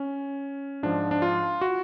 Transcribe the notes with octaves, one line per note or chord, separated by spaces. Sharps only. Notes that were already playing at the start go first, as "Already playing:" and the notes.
Already playing: C#4
G#2 F3 D4
D4
F4
F#4